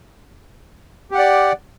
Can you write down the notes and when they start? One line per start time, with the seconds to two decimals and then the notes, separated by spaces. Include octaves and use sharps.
1.11 G4
1.15 F#5
1.19 D5